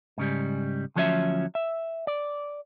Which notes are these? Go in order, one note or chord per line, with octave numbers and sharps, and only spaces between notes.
G#2 C#3 G3
D2 F3 F#3 C#4 C5 E5
E5
D5